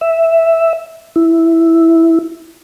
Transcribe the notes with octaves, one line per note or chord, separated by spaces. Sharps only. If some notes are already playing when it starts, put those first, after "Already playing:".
E5
E4